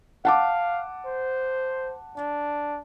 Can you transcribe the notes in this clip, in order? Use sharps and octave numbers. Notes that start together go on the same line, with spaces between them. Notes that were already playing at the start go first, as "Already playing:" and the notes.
F5 F#5 A5 D6
C5
D4